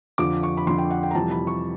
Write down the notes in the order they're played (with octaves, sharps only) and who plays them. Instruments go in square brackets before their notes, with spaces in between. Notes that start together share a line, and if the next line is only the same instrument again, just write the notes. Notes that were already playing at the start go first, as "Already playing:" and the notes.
[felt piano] F2 D3 F3 D6
C#6
B5
F2 D3 F3 C6
G5
F#5
G5
A#5
F2 C3 E3 G3 A5
B5
C#6